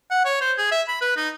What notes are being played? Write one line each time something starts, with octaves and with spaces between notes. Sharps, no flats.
F#5
C#5
C5
G#4
E5
B5
B4
D#4